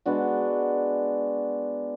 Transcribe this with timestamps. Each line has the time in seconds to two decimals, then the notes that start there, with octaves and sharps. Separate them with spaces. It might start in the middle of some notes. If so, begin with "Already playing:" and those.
0.05 G#3 B3 D4 F#4